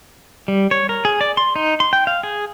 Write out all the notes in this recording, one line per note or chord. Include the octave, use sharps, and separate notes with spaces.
G3
C#5
A#4
G#4
D5
C6
D#4
C6
G5
F5
G#4